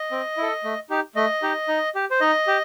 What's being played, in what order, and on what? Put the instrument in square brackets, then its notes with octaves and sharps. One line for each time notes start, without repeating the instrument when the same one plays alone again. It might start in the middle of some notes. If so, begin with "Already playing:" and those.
Already playing: [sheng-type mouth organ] D#5
C4
E4
A4
A3
D#4 G4
A3 D#5
D#4 G4
D#4
G4
C5
D#4 D#5
G4